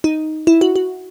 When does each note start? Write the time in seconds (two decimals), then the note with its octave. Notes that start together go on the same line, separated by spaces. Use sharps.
0.04 D#4
0.47 E4
0.61 F#4
0.76 F#4